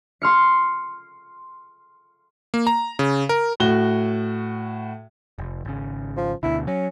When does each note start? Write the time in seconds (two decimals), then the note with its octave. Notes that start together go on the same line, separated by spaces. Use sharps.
0.22 C6 F6 C#7
2.54 A#3
2.67 A#5
2.99 C#3
3.29 A#4
3.60 A2 F#4 G7
5.39 F1
5.65 G#1 C#3
6.17 F3
6.43 D2 B2 D3 E4
6.67 F#3 C#4